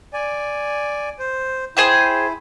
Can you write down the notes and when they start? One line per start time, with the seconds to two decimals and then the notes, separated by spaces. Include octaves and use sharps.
0.13 D5 G#5
1.19 C5
1.77 E4 G#4 C5 G5